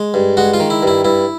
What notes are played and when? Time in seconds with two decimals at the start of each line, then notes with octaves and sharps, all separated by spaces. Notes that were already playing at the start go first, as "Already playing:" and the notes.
Already playing: G#3
0.14 G2
0.37 G#3 F#4
0.54 F4
0.60 D#3
0.70 E4
0.82 G2 E4
1.04 G2 E4